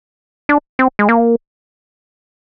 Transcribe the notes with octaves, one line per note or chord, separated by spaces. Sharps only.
D4
C4
G#3
A#3